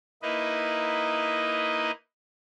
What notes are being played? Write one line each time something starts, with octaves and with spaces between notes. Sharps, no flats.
A#3 D#4 E4 B4 D#5